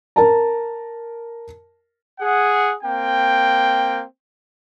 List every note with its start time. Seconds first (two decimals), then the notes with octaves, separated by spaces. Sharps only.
0.16 A#4 A5 A#5
2.20 G#4 F#5
2.83 A#3 C4 G5